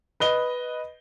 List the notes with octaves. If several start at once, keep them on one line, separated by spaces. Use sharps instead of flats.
B4 D#5 G7